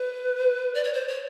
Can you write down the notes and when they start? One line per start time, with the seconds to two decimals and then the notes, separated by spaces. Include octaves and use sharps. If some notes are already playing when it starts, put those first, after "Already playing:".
Already playing: B4
0.74 D5
0.84 C#5
0.93 C5
1.08 C#5